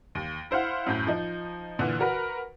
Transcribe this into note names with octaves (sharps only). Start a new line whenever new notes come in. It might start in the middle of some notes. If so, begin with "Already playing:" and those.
D#2
E4 C5 F5 F#5
F#2 A2 G6
F3 D#4
A#2 D3 E3
F#4 A#4 B4